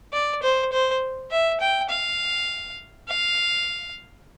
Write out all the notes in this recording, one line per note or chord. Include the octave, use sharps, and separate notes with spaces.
D5
C5
C5
E5
G5
F5
F5